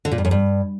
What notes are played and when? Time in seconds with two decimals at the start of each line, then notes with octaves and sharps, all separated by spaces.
0.05 D3
0.11 A#2
0.18 G2
0.25 F#2
0.31 G2